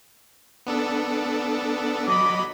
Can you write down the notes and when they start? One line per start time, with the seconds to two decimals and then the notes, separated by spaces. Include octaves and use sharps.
0.66 B3 D4 A4
2.08 F#3 D#5 B5 D6